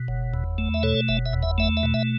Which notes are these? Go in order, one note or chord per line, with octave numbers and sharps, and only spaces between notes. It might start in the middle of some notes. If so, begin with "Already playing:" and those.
Already playing: B2
F#1
E2
A3
E5
B2 A4 C#5
F#1 E5
E5
E2
E5
A3 E5
E5
B2
E5